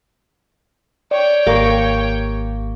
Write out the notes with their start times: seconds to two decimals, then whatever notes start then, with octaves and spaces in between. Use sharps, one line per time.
1.11 C#5 D5 G5
1.47 G#1 A#3 G4 F5 C#6